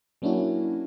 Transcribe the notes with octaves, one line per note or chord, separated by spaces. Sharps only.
F#3 A#3 C#4 D4 E4 F#4